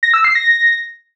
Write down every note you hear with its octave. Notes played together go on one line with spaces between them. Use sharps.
A#6
E6
C7
A#6